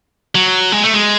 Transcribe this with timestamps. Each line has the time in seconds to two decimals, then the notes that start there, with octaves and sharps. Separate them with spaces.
0.35 F#3
0.72 G#3
0.83 A3
0.93 G#3